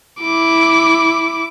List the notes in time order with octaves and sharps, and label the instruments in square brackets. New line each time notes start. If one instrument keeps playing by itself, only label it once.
[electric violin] E4 D6